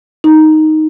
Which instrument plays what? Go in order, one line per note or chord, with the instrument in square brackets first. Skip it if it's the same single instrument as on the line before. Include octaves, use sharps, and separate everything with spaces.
[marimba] D#4